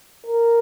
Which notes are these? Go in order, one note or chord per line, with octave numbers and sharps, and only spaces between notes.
A#4